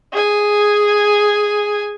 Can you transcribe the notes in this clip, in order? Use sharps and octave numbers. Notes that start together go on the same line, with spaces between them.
G#4 G#5